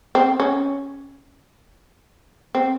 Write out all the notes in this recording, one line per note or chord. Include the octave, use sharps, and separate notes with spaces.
C4
C#4
C4